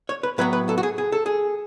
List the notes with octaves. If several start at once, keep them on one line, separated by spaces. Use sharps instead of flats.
C#5
B4
A2 F#3 B3 B4
B4
A4
F#4
G#4
G#4
A4
G#4